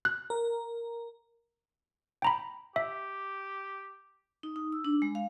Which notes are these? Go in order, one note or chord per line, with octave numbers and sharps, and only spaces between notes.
F#6
A#4
G5 A#5 B5
G4 E5
D#4
D#4
E6
D4
G#3
F5